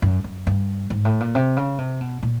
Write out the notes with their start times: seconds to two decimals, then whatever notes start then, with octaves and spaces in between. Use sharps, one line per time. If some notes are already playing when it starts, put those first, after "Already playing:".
0.02 F#2
0.24 F#2
0.47 G2
0.90 G#2
1.05 A2
1.20 A#2
1.35 C3
1.57 C#3
1.78 C3
2.01 B2
2.23 A#2